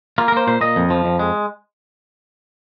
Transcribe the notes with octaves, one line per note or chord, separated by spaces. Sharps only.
A#3 F4
A#4
A#3 C5
A#2 C5
A#2 D#5
F2
F3
F2
G#3